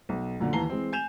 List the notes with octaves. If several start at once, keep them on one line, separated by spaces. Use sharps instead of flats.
B1
F#2 A#2 D3
D#2 E3 A5 A#5 C7 G7
E3 G#3 C4
G#5 G6 E7 F7